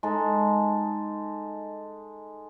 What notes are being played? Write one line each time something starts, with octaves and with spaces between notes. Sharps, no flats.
G#3 D#4 A4